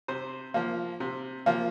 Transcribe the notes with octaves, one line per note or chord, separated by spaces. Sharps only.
C3 C5
F3 A#3
C3
F3 A#3